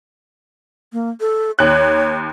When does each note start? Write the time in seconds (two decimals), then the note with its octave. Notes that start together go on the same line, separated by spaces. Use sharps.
0.93 A#3
1.20 A4
1.59 D#2 C#5 F#6